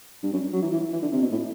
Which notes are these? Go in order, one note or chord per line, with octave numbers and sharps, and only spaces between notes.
G2
F#2
F#3
E3
E3
E3
D3
C3
B2
A2